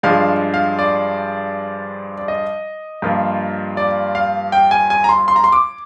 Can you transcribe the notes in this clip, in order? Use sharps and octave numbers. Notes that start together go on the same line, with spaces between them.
G2 F3 G#3 D4 F5
F5
D5
D5
D#5
G2 F3 A#3 F4
D5
F5
G5
G#5
G#5
A#5
C6
C6
A#5
C6
D6